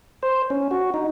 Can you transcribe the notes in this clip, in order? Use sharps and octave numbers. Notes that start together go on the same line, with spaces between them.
C5
C#4
F#4
D#4